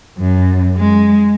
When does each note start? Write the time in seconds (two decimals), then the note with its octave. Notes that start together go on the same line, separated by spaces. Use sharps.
0.19 F#2
0.77 G#3